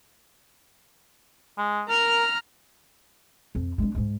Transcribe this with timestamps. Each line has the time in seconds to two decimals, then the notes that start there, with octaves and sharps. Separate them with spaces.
1.58 G#3
1.89 A#4 A#5 F6
3.55 F2
3.78 G#3 D4
3.95 G#2 G#3